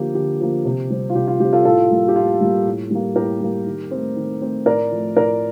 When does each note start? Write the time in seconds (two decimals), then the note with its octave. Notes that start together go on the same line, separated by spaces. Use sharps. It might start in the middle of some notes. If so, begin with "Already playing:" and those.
Already playing: D3 F3 A#3 G4
0.15 D3 G4
0.40 F3 A#3
0.65 C3
0.90 G3 C4
1.10 F4
1.15 C3 G4
1.28 F4
1.40 G3 C4 G4
1.53 F4 A4
1.65 A2 F4 A4
1.91 G3 A#3
2.08 G4
2.16 A2 F4
2.41 G3 A#3
2.66 A2
2.91 G3 A#3
3.16 A2 G4 A#4
3.41 G3 A#3
3.66 D#3
3.91 A3 C4
4.16 D#3
4.41 A3 C4
4.66 A2 A#4 D5
4.91 F3 A3
5.17 A2 A#4 D5